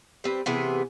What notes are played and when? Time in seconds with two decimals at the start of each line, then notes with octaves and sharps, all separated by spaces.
0.24 G3 C4 B4
0.46 C3 E3 B3 G#4